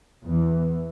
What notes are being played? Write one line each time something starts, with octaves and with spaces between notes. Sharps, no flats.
E2 E3